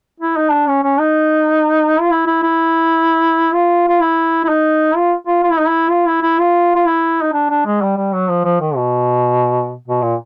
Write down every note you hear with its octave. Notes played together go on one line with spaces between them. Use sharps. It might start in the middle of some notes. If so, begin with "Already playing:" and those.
E4
D#4
D4
C#4
C#4
D#4
F4
E4
E4
E4
F4
F4
E4
E4
D#4
F4
F4
F4
E4
D#4
E4
F4
E4
E4
F4
F4
E4
D#4
D4
D4
G#3
G3
G3
F#3
F3
F3
D#3
B2
B2
A#2